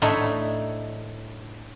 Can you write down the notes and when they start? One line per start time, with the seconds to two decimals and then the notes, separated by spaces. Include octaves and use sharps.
0.02 A2 D4 D#4 C#5 E5 B5